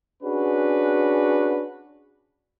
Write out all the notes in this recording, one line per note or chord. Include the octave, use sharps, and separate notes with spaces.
C#4 D4 F#4 G#4 B4